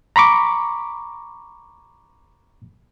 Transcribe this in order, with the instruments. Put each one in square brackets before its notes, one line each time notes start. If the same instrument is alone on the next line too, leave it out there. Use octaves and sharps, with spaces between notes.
[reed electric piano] A#5 B5 C#6 D6